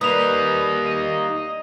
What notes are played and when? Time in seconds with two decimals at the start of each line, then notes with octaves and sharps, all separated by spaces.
0.01 G3 A#3 D#4 B4 D#6 F7
0.86 D#5